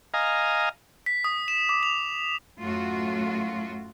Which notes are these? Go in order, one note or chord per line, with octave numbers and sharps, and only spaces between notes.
D#5 F5 G#5 A#5
B6
D#6
E7
D6
F7
F#2 A2 A3 F4 F#4